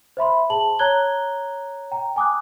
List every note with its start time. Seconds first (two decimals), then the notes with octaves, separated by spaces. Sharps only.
0.17 C5 E5 B5 C6
0.50 G#4 A5 F#7
0.79 C#5 A#5 F#6 G#6 G7
1.92 G5 A#5
2.16 G#5 D6 D#6 F#6